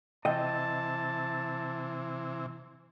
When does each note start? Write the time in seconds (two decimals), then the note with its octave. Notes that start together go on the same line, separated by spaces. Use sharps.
0.25 C3 E3 D#5 G5 A5